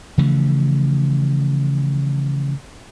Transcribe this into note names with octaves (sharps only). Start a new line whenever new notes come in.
C#3 E3 F3 A3